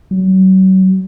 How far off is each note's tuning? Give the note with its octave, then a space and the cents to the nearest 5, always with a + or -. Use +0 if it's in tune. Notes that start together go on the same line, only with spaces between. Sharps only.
F#3 +35